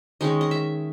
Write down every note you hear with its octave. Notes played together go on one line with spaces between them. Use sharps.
D#3 G#3 C#4 D#5
D#5
E5